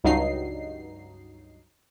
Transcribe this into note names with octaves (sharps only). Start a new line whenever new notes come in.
C#2 G2 F#3 D#4 C7